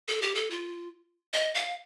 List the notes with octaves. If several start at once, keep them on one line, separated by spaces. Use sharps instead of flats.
A4
G4
A4
F4
D#5
F5